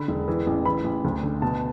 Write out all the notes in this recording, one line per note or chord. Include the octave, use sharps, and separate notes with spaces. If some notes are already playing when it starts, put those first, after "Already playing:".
Already playing: D3 B5
E1
E3
A1
E3 B5
A1
D2
D3
B2 A5